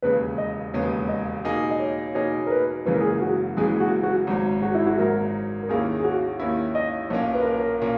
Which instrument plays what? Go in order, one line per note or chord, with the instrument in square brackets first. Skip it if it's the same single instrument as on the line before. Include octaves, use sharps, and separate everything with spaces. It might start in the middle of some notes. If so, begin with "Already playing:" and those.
[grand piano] E1 D#2 C#3 G#3 B3 [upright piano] B4
[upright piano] D#5
[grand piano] E1 D#2 C#3 G#3 B3 [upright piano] C#5
[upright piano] D#5
[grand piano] B2 A#3 D#4 G#4
[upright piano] D#5
C#5
[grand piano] B2 A#3 D#4 G#4 [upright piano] C#5
[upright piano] A#4
B4
[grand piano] F#1 F#2 C#3 E3 G#3 [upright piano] B4
[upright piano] A#4
G#4
A#4
F#4
[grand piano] F#1 F#2 C#3 E3 G#3 [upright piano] G#4
[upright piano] F#4
F#4
[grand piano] G#1 G#2 F#3
[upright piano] F#4
E4
F#4
[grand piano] G#1 G#2 F#3 [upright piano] A#4
[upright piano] A#4
[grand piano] D#2 D#3 A#3 C#4 E4 [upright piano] G#4
[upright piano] G#4
F#4
[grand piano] D#2 D#3 A#3 C#4 E4
[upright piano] D#5
[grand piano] B1 A#2 A#3 C#4 [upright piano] C#5
[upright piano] B4
A#4
B4
A#4
[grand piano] A#2 A#3 C#4